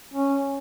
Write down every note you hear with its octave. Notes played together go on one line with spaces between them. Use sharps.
C#4